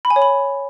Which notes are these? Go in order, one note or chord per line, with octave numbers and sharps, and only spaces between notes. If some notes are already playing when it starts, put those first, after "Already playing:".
B5
G#5
C#5
B5